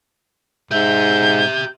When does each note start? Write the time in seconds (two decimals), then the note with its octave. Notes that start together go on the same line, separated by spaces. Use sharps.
0.71 G#2 G4 E5 G6